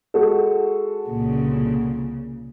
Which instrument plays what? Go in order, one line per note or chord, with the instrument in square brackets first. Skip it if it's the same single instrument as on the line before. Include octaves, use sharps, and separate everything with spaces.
[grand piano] G#3 F#4 A4
[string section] C2 A#2 C#3